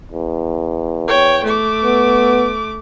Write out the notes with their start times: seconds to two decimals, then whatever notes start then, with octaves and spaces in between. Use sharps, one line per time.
0.12 E2
1.08 C#5 G5
1.44 A3 D6
1.83 B3